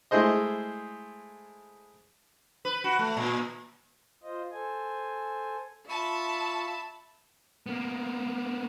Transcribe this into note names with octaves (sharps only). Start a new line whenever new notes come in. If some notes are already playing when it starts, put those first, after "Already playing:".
G#3 A3 E4 G#4 C5 D#5
B4
F#4
A3
A#2
F4 C5 D#5
A4 C5 G#5
F4 E5 A5 B5 C#6
A#3 B3